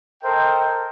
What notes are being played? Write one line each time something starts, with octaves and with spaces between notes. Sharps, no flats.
A4 A#4 C5 D#5 G5